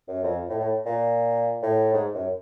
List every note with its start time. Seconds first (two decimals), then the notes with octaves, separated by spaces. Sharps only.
0.08 F#2
0.23 F2
0.49 A2
0.59 A2
0.86 A#2
1.62 A2
1.93 G#2
2.14 F#2